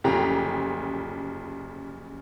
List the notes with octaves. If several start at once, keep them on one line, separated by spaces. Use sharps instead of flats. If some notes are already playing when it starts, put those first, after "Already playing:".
F#1 D2 C#3 F3 G4 A#5